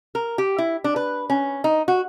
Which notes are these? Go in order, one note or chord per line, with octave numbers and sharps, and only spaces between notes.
A#4
G4
E4
D4
B4
C#4
D#4
F#4